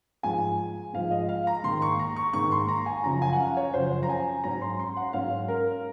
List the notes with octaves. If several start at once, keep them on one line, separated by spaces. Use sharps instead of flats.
G#2 F3 G#3 G#5
G#2 F3 G#3 F5
D#5
F5
A#5
G#2 D#3 A#3 C6
C#6
A#5
C#6
G#2 D#3 A#3 C#6
C6
A#5
G#5
F#2 C#3 F3 A#5
G#5
F#5
F5
C#5
F#2 C#3 F3 C5
A#5
G#5
G#2 F#3 C#4 A#5
C6
C6
F#5
G#2 F#3 C#4 F5
A#4